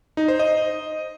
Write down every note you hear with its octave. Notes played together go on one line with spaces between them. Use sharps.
D#4
C5
D#5